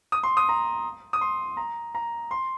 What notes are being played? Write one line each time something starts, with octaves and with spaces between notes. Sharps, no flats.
D#6
C6
D#6
A#5
D#6
C6
A#5
A#5
C6